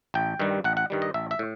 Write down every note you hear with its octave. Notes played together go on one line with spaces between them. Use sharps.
A1 G5
G2 D#3 G3
A1 F#5
F#5
G2 D#3 G3
D#5
A1 E5
E5
A2